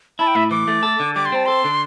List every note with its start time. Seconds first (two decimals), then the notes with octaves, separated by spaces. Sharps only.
0.19 E4 A5
0.27 G5
0.35 A2 E5
0.51 E3 D6
0.68 A3
0.83 A4
1.00 D3
1.15 G3 D6
1.25 C6
1.32 C4 A5
1.46 A4 C6
1.64 D3